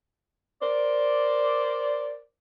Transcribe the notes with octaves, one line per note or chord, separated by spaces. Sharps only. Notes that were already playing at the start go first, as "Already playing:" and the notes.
A#4 C5 D5